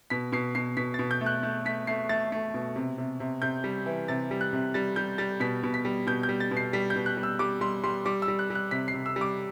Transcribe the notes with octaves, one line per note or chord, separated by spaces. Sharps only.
B2 B6
B2 C7
B2 C7
B2 B6
B2 A6
G6
A3
F#6
A3
A3 B6
A3 C7
A3 A6
A3
B2
C3
C3
C3
C3 G6
G3
E3
C3 A6
G3
F#6
C3
G3 A6
G3 G6
G3 A6
B2 B6
B2
B6
G3
B2 G6
G6
G3
A6
B2
C7
G3 B6
G6
B2
F#6
G3
E6
G3 D6
G3 C6
G3 C6
G3 D6
E6
G3
F#6
G3 F#6
C3 B6
C7
C3
E6
G3
D6